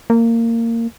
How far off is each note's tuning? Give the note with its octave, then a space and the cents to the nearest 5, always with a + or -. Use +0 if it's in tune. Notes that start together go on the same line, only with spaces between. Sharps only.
A#3 -20